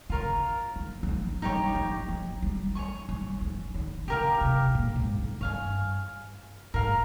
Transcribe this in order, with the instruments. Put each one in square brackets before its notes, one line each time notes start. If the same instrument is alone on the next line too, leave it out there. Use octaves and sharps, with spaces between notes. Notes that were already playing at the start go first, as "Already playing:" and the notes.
[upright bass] C#3 [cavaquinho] F4 A#4 C#5
[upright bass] D#3
G3
F3
[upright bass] G3 [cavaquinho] D#4 G4 C#5
[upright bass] F3
F3
G3
[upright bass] F3 [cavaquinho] C#5 G#5 C#6
[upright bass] G3
F3
D#3
[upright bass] C#3 [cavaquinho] G4 A#4 F5
[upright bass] C3
A#2
G#2
F2
[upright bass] G2 [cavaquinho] C#5 F5 G#5
[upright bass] G#2 [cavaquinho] A#4 F5 A#5